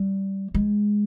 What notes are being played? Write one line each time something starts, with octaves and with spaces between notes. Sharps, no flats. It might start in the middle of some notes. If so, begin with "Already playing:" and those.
Already playing: G3
G#3